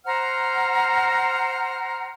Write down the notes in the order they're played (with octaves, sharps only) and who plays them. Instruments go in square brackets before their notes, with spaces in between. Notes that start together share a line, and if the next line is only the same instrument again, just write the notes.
[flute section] C5 F#5 A#5 F6